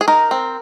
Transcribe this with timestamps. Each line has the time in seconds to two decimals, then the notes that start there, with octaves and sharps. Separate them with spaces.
0.01 G#4
0.08 D#4 A#4
0.31 C4